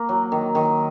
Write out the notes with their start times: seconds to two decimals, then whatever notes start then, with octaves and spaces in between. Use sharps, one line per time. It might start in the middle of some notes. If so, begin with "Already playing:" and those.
Already playing: A#3
0.09 F#3
0.32 D#3
0.55 D#3